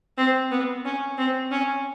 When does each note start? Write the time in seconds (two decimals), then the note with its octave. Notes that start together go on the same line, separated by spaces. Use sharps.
0.18 C4
0.51 B3
0.85 C#4
1.18 C4
1.51 C#4